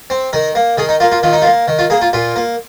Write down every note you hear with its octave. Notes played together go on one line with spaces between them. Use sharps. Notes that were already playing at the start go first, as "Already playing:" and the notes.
C4
D#3 A#4
A#3
D#3 G#4
D#4
A#3 F4
F4
D#3 F4
D#4
F4
A#3
D#3
F4
A#3 G#4
F4
A#2 F4
A#3